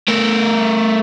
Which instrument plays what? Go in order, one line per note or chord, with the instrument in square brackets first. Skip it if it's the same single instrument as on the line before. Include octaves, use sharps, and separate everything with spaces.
[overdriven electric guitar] A3 A#4